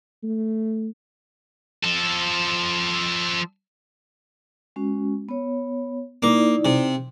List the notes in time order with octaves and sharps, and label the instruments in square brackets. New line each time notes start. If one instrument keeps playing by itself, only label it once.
[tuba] A3
[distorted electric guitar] F3 A4
[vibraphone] G#3 C#4 F#4
B3 C#5
[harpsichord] A#3 [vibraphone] D#4 E4 D5
[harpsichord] C3